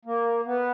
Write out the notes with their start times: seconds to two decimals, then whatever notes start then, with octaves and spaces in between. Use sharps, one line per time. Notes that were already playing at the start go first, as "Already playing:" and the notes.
0.05 A#3
0.46 B3